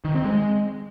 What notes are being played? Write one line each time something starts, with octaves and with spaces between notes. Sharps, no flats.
D#3
C4
G#3